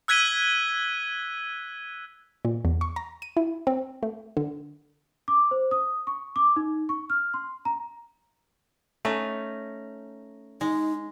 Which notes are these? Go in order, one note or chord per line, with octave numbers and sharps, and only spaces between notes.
E6 F#6 G#6 B6 D#7 G7
A#2
E2
C#6
A#5
D#7
E4
C4
A3
D3
D6
C5
D#6
C#6
D6
D#4
C#6
F6
C6
A#5
A3 C#4 D#4
G#3 D#4